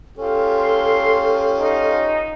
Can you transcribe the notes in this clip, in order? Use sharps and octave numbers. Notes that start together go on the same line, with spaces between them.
C#4 F4 G4 A4
C6
D#4